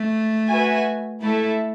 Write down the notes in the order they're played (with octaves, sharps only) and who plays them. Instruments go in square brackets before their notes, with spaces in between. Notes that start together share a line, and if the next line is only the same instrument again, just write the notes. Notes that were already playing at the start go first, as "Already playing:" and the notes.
Already playing: [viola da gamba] A3
[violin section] F#4 B4 E5 G#5
[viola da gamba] A3 [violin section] E4 A4 E5